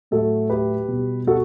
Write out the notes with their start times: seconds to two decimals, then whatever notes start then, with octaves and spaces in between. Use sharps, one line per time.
0.11 A2 F#3 A3 F#4 A4
0.50 G4 B4
0.88 B2 G3
1.27 F#4 A4